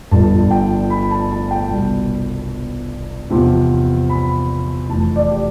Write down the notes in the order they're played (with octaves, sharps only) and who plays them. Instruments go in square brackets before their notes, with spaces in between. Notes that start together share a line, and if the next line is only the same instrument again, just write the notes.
[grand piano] G1 G2 F3 A5
G5
B5
A5
A5
G5
C2 B2
E2 C3 F3
B5
F1 F2 E3 A5
D5
G4